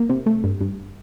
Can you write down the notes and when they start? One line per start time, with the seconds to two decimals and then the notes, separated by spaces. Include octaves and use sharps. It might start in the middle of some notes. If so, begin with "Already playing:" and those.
Already playing: A#3
0.09 C3
0.26 A3
0.44 G2
0.61 G2